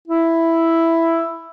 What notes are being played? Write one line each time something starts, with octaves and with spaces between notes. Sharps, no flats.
E4